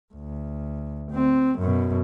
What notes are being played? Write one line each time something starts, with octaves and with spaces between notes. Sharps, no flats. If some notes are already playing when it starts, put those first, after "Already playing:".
D2
C4
F#2 B2